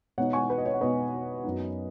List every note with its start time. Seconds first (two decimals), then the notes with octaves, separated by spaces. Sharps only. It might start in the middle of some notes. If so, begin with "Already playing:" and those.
0.18 B2 B3 D#4 C#5 F#5
0.33 G#5 C#6
0.50 B4
0.58 D#5
0.65 C#5
0.74 F#5
0.81 B2 B3 D#4 B4 D#5
1.44 F#2 F#3 B3 D#4